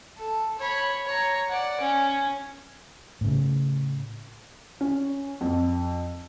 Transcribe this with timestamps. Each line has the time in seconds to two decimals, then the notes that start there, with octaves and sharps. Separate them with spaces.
0.17 A4
0.58 C#5 B5
1.06 C#5 A#5
1.49 D5 F#5
1.80 C#4
3.21 A2 C#3
4.81 C#4
5.41 F2